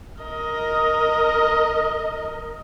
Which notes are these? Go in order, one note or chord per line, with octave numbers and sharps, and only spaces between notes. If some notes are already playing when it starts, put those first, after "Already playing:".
A#4 D#5